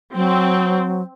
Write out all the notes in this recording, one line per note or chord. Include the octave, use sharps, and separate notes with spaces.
F#3 C4